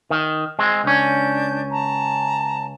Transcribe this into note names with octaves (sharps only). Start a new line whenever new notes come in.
D#3
G#3 C4
C#2 C#4 D4 G6
A5 A#5